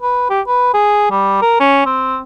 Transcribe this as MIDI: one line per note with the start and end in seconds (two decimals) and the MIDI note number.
0.02 0.26 71
0.30 0.41 67
0.47 0.72 71
0.74 1.06 68
1.10 1.38 55
1.42 1.57 70
1.60 1.82 61
1.86 2.19 60